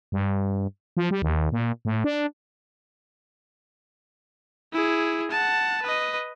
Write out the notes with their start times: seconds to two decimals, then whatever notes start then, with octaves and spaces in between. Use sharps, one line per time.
0.12 G2
0.97 F3
1.11 G3
1.22 D#2
1.52 A#2
1.85 A2
2.04 D4
4.73 E4 G#4
5.31 F#5 A5
5.82 B4 D#5